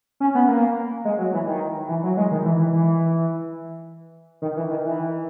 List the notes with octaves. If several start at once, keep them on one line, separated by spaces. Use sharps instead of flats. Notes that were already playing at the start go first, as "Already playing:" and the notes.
C#4
B3
A#3
G#3
F#3
E3
D#3
E3
F#3
G#3
D#3
E3
E3
E3
D#3
E3
D#3
E3